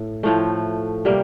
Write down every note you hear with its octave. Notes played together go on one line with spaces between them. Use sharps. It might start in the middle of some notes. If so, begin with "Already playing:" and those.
Already playing: A2
A2 F3 A3
C3 G3 A#3